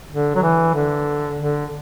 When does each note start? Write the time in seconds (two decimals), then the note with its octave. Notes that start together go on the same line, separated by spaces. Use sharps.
0.11 D3
0.36 F#3
0.43 E3
0.75 D3
1.37 D3